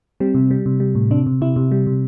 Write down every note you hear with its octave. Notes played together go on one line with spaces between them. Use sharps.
G3 C4
C3
G3
C3
G3
A2
C3 D4
C3
C3 E4
C3
G3
C3